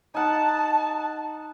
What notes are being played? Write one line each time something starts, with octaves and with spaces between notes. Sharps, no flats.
D#4 F#5 A5